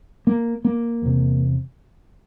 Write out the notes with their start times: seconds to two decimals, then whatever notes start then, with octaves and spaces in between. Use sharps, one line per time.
0.27 A#3
0.65 A#3
1.02 E2 C3